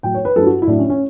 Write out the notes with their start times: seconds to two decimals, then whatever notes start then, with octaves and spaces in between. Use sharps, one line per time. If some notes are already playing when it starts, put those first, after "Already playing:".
0.03 A2 F#3 G5
0.15 C#5
0.25 B4
0.36 G2 F#3 A4
0.46 F#4
0.62 E4
0.67 A2 F#3 D4
0.79 C#4
0.90 C#4